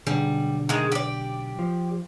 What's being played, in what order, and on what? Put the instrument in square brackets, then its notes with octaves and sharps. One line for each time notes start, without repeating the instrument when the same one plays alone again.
[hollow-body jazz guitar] B1 D3 G#4 [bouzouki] G3
[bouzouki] D#3 G#3
G4 D5
[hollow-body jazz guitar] F3